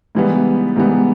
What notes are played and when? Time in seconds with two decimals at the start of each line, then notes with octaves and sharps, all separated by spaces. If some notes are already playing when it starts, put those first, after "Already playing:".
0.15 G#2 E3 G3 B3
0.76 G#2 E3 G3 B3